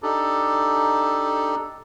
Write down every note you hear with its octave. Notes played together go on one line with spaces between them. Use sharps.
D4 D#4 G4 A4